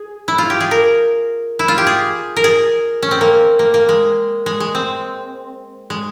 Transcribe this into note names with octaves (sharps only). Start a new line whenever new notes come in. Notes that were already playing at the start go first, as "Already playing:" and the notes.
Already playing: G#4
E4
F4
G4
G#4
A#4
E4
F4
G4
G#4
A#4
G#4
C#4
C4
A#3
A#3
A#3
G#3
G#3
G#3
C4
G#3